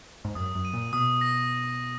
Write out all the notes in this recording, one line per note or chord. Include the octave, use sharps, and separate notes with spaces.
G#2
F#2 D#6
F#2
D#7
A#2
B2 D#6
A#6